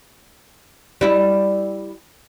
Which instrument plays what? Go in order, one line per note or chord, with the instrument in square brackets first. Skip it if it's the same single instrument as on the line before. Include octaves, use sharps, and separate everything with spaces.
[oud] G3 E4